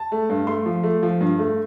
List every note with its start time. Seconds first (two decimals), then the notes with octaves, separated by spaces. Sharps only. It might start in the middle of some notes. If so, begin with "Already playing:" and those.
Already playing: A5
0.12 A3
0.30 G2
0.47 A3 C6
0.66 F3
0.84 A3
1.03 F3
1.21 G2
1.39 A3